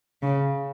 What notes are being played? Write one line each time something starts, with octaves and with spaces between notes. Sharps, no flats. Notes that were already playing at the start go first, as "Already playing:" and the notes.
C#3